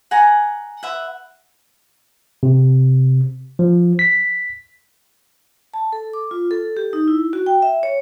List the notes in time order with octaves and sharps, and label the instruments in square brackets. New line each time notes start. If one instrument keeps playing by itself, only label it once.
[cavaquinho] F#5 G#5 A#5
B4 E5 F#5
[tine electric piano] C3
F3
B6
[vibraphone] A5
A4
D6
F4
A4
G4
D#4
E4
F#4
G5
E5
C#5